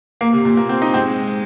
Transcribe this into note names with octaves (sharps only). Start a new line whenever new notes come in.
A#3
C3
A#2
A#3
C4
D#4
G#3 C4